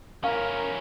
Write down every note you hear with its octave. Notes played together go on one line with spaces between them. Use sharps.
C#4 E4 A#4 F5